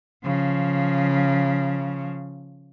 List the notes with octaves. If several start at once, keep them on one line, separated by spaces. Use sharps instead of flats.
C#3 F3